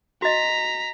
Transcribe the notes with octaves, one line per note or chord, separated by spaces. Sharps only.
F#4 D#5 A#5 B6